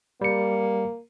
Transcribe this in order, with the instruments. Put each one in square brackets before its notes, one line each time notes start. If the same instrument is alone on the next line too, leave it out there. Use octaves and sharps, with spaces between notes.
[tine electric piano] G3 C#7 [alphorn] A#3